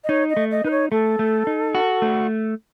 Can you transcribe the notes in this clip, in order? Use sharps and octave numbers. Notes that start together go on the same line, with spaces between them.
D#5
D#4 C#5
D#5
A3
D#5
D#4 B4
C#5
A3 A4
A3
D#4
F#4
A3